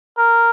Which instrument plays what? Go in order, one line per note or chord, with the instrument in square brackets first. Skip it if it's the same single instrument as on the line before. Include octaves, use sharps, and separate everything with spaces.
[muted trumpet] A#4